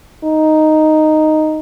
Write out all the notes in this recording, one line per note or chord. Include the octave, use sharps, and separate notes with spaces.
D#4